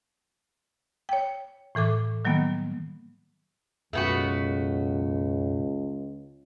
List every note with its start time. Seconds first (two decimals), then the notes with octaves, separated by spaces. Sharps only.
1.09 C#5 G5
1.75 A2 E3 A4 D6
2.25 D#3 F#3 G3 A#3 B3
3.93 C#2 F#2 B2 F#3 A3 B3 F#4